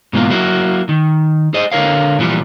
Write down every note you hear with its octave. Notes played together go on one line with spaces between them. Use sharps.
G#2 B2 E3 G3 A#3 F4
F#3 A#3 E4 F#4
D#3
G#4 C5 D#5
D3 A#4 C#5 F5
A#2 E3 F3 G3